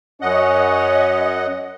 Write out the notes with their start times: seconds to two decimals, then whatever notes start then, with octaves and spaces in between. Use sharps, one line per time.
0.22 F#2 C#4 C#5 D#5 F#5